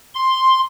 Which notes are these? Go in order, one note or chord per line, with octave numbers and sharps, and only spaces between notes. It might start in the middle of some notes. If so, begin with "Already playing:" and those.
C6